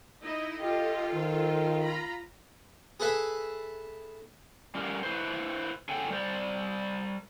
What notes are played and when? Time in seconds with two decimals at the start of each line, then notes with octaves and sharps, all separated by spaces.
0.22 D#4 E4 D#5
0.61 F4 G4 A4 D#5
1.13 D#3 C5
1.82 F4 A#5 B5
3.00 G#4 A4 B4 E5 A5
4.75 G3 A3 C#4 G4 A#4
5.03 E4 B4 C5
5.89 C#3 A4 G5 G#5
6.10 G3 C5 D5